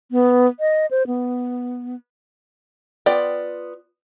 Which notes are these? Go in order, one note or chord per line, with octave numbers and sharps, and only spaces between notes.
B3
D#5
C5
B3
B3 F4 D5 G5